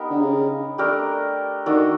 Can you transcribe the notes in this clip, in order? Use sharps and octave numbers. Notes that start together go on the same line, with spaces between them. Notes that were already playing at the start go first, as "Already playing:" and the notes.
Already playing: B3 D#4 G4 A#4
D3
C#3
A3 D4 G4 A#4
D#3 A3 D4 F#4